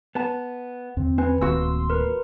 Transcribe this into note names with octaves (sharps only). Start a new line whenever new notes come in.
B3 A5
E2 D3 C4
C4 B4 G#5
D1 D#3 A3 A#3 C4 F#4 C6 E6
A#4 B4